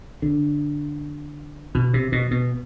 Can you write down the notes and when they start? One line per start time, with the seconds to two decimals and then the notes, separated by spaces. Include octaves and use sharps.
0.22 D3
1.75 B2
1.94 C3
2.12 B2
2.31 B2